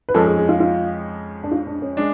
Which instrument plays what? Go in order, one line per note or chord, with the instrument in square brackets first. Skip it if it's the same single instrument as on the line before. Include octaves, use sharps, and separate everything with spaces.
[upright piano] B4
[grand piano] F2 F3 G#3 C#4 [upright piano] A4
[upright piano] G#4
G#4
F4
F4
D4
F4
D4
C#4
[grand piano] G#3 D4